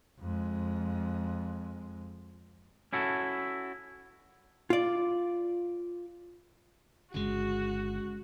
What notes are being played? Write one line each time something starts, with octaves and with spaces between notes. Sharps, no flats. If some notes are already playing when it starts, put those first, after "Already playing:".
F2 G#3
C#4 E4 F#4 A4
F4 D5
G1 C#3 G#3 F#4